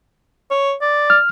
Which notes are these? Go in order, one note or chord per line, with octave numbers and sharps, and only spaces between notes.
C#5
D5
F6